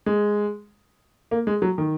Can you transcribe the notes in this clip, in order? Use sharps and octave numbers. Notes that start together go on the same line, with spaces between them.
G#3
A#3
G#3
F#3
D#3